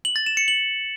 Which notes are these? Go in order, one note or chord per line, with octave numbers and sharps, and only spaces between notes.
F#7
A6
E7
C#7
F#7